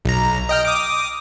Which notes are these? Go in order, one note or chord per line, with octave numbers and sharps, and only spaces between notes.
B1 A#5
D#5 G5 F6
D6 D#6